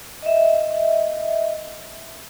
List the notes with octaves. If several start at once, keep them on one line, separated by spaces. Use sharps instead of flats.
D#5 E5